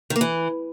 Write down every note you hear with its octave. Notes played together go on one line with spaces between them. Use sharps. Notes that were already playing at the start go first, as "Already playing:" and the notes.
D#3
A#3
E3